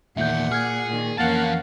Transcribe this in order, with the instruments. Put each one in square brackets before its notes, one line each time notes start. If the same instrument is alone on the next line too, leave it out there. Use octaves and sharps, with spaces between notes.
[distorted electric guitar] E2 D#3 [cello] A#2 F#5 [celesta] E5 G6
[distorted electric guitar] G#4 [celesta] F6 G#6
[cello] A#2 D#3
[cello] F2 C#4 [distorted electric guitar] E3 A5 [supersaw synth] A#3 F5 F#5 [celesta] A6